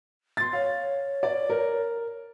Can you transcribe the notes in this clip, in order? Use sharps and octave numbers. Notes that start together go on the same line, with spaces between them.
C6 A6
C#5 F5
D5
A#4